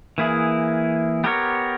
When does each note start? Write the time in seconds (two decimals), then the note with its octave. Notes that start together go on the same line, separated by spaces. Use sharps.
0.18 E3 A#3 E4 G#4
1.24 B3 G4 A#4 C#5